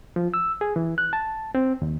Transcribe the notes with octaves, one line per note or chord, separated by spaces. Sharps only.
F3
E6
G#4
E3
F#6
A5
C4
D#2